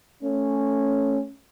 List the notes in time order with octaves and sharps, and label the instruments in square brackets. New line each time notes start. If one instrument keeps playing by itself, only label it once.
[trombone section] A3 C#4